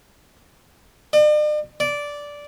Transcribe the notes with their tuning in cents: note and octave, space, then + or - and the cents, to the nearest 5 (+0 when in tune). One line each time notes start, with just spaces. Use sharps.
D5 +45
D5 -10